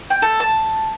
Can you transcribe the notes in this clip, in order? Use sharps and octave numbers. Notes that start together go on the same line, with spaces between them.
G5
A4
A5